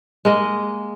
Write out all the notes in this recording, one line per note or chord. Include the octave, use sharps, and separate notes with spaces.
G#3 A#3 D#5